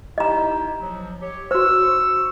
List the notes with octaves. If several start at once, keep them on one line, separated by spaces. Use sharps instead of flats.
D#4 E4 G4 D#5 A#5
F3 F#3
G4 C#5
F#4 C5 C#6 E6